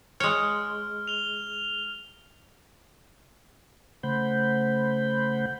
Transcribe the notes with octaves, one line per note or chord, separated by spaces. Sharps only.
G#3 C#5 F6
F7 G7
C#3 A3 C5 F#5 B5 G6